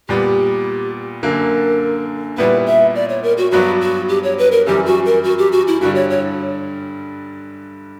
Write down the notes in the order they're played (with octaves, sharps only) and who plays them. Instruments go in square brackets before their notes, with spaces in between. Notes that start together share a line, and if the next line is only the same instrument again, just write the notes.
[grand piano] A#2 G3 B3 [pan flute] G4
[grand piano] F#2 D3 A#3 [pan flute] A#4
[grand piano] A#2 G3 B3 E4 [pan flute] B4
[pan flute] E5
D5
C#5
A#4
F#4
[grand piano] G2 F#3 B3 D4 [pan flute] F#4
[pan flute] F#4
G4
C#5
B4
A#4
[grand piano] F#2 E3 G3 [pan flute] G4
[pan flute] F#4
A#4
F#4
G4
F#4
E4
[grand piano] G2 D3 G3 [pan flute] F#4
[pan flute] C#5
C#5